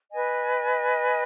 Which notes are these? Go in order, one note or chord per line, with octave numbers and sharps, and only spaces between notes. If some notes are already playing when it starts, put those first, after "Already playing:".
B4 D#5 G#5